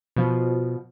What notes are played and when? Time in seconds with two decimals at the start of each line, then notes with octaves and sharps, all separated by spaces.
0.16 B2 F3